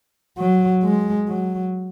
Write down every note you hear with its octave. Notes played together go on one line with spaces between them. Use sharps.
F#3
G#3
F#3